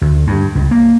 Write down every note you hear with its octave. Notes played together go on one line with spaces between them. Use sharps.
D2
G2
C#2
A#3